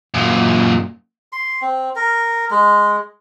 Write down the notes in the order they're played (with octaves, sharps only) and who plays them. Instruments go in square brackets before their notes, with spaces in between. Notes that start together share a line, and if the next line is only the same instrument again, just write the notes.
[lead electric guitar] F#2 A#2
[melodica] C6
C4
A#4
G#3